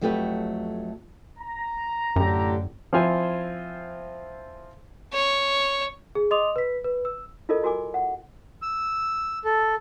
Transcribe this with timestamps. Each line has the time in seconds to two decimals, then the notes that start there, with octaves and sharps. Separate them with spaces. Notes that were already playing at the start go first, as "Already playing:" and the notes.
0.01 F2 F#3 A3 G4 B4 C#5
1.39 A#5
2.16 F#2 A2 D3 G4
2.93 F3 C4 E4 F4 C5 G#5
5.13 C#5
6.15 G#4
6.31 D#5 C6 D6 D#6 F7
6.56 B4 B6
6.84 B4
7.05 E6
7.49 E4 F4 A4 A#4 D#5
7.63 E4 F#4 A#4 G#5 D6
7.94 F#5
8.62 E6
9.45 A4